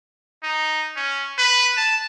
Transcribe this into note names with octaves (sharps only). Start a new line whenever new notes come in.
D#4
C#4
B4
A5